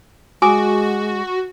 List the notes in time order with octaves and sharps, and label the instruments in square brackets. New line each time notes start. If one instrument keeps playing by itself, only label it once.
[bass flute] G#3 [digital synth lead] F#4 [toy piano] G#5 D6 D#6